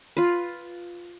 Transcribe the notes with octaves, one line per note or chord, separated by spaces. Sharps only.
F4 B4